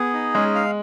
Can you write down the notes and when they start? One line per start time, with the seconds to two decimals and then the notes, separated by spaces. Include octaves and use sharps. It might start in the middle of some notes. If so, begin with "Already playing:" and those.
Already playing: B3 G#4
0.14 D#4
0.34 G#3 C#4
0.55 F5